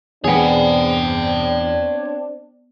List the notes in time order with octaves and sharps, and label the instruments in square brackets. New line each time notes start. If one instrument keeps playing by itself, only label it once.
[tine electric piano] E2 [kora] B3 G#4 [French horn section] C4 D4 [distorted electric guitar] C#5 G5